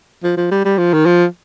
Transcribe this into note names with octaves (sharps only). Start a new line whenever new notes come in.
F3
F3
G3
G3
F3
D#3
F3